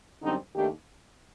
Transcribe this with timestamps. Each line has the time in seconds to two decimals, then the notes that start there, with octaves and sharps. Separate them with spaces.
0.22 F#2 D3 G3 C4 D#4
0.55 D#2 D#3 A3 D4 G4